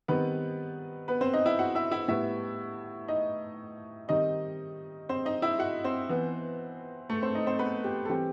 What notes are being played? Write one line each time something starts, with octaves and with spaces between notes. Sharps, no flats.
D#3 G3 B3 C4 B4
B3 B4
C4 C5
D#4 D#5
E4 E5
F#4 F#5
E4 E5
E4 E5
A2 G3 B3 E4 E5
D#4 D#5
D#3 G3 C4 D#4 D#5
C4 C5
D#4 D#5
E4 E5
F#4 F#5
C4 C5
E3 B3
A3 A4
C4 C5
D#4 D#5
C4 C5
B3 B4
G4
A4
E3 G3 C4 G4